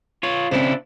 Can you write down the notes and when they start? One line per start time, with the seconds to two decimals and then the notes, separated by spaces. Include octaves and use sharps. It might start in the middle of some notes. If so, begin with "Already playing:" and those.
0.23 F4 C#5
0.51 C#3 C4 D4 E4 C5